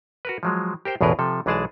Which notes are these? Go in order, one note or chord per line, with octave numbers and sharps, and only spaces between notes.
F#4 A#4 B4
F3 F#3 G#3
G4 A#4 C5 G5
A1 E2 B2 G#4 A#4 B4
C3 F3 A4
B1 E3 G#3 G#4 D5 A5